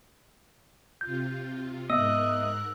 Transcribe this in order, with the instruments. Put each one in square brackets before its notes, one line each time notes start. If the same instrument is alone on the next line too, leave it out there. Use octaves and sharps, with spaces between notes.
[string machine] C3 F4 [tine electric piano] G6
[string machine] G#2 A#4 F#6 [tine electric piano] B3 E5 [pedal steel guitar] D#5 [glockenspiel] E6